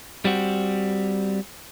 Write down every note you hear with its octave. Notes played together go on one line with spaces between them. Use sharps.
G3 C4 F#4